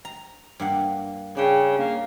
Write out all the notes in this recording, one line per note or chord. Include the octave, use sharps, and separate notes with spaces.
A#5
G2 A#3 F#5
C#3 D4 G5
A#3